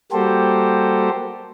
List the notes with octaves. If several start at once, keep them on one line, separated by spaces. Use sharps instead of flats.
G3 A#3 F#4 G4 A4 C5